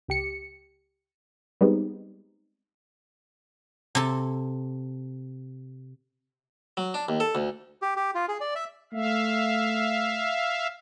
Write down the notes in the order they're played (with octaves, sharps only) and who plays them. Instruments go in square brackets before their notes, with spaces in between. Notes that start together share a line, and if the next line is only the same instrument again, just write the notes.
[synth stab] C#2 G4 C#7
G3 G#3 B3 C4 D#4
[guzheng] C3 A4
[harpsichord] F#3
D4
D#2
A4
D2
[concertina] G4
G4
F4
G#4
D5
E5
[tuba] A3 [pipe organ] E5 F5